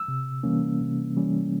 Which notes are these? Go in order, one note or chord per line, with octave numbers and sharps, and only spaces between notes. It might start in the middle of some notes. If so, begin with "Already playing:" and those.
Already playing: E6
C3
E3 G3 A#3 C#4
C3
E3 G3 A#3 C#4